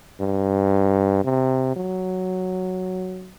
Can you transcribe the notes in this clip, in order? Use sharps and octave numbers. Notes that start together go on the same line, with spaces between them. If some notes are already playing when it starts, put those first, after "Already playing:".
G2
C3
F#3